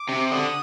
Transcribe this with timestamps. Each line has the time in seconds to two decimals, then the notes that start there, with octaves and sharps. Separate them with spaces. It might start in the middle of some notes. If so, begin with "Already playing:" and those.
Already playing: D6
0.09 C3
0.32 D3 D#6